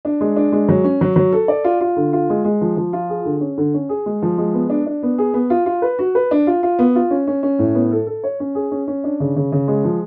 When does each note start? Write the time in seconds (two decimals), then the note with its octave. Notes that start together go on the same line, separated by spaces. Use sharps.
0.05 D4
0.21 G#3
0.36 D4
0.52 G#3
0.69 F#3
0.84 C#4
1.01 F#3
1.16 F#3
1.33 A4
1.48 D5
1.64 F4
1.81 F4
1.97 D3
2.13 F4
2.30 G#3
2.44 G#3
2.61 F3
2.77 F3
2.93 F4
3.09 G#4
3.25 D3
3.41 C#4
3.58 D3
3.74 C#4
3.89 G#4
4.06 G#3
4.22 F3
4.38 G#3
4.54 B3
4.70 D4
4.86 D4
5.03 B3
5.18 G#4
5.34 B3
5.50 F4
5.66 F4
5.82 B4
5.99 F#4
6.15 B4
6.31 D4
6.47 F4
6.63 F4
6.79 B3
6.95 F4
7.11 C#4
7.27 C#4
7.43 C#4
7.59 A2
7.75 B3
7.91 A4
8.07 A4
8.24 C#5
8.40 C#4
8.55 G#4
8.72 C#4
8.88 C#4
9.04 D4
9.20 C#3
9.36 C#3
9.52 C#3
9.68 G#3
9.84 F3